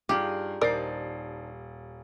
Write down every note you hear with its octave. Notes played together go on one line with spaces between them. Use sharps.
G2 D#4 F4 G4 G#4 F5 F#7
D#1 D4 D#4 A#4 C5 D5 A6 C7